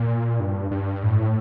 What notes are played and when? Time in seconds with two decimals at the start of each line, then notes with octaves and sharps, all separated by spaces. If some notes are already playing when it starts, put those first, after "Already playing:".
Already playing: A#2
0.40 G2
0.71 G2
1.03 A2